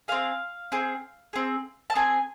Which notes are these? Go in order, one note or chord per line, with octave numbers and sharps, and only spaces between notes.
C4 G#4 F5
C4 G#4
C4 G#4
A5
C4 G#4 G#5